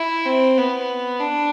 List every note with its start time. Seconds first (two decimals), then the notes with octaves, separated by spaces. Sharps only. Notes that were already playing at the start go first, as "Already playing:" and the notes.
Already playing: E4
0.25 C4
0.58 B3
1.20 D4